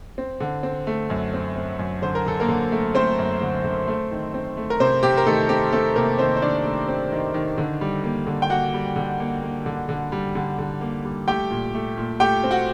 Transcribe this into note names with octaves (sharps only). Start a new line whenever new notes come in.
C4
D3
C4
A3
F#2
C4
C4
F#2
D3 C5
A#4
D3 A4
A#3 A#4
D3
A3
A3 C4 C5
F#2
D3
D3
A3
D#3
C4
A3
A#4
C3 C4 C5
C3 G4
A#4
D#3 A3 A4
C4 G4
A3 C4 A4
C3 A#3 A#4
D#3 C4 C5
C5
D#3 D4 D5
A3
C4
D#3
D#3
D3
G3
A#3
D3
G5
A#3 F#4 F#5
G3
D3
A#3
A#3
D3
D3
G3
D3
D3
A#3
G3
A3 G4 G5
A#2
A3
A#2
A3 G4 G5
C4
F#4 F#5